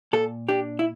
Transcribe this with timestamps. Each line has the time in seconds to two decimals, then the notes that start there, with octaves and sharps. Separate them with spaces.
0.13 A#2 A4
0.49 D4 G4
0.79 E4